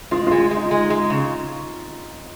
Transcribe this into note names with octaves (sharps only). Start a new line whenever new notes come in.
G#3 F4
F4
G#3
G#3
D#4
G#3
G#3
C#3